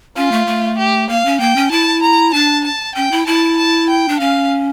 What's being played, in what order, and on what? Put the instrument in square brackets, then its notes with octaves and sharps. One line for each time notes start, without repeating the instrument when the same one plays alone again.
[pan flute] C#4 [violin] F4
[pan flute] A3
A3
[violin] G4
[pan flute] A#3 [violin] F5
[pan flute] C#4
[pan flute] A#3 [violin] G5
[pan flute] C#4
[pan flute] E4 [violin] A5
[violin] A#5
[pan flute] D4 [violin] A5
[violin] A5
[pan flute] C#4 [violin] G5
[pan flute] E4
[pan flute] E4 [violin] A5
[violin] A5
G5
[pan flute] D4
[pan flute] C#4 [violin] F5